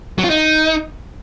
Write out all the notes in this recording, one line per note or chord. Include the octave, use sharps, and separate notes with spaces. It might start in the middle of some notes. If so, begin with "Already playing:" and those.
F#3
F4
D#4